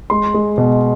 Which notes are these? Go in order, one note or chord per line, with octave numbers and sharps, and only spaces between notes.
G#3 C6
G#3
B2